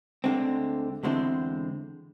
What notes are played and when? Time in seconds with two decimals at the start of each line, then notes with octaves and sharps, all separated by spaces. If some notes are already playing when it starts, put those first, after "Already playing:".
0.24 D2 D3 G#3 C4
1.03 E2 D3 G#3 C4 E4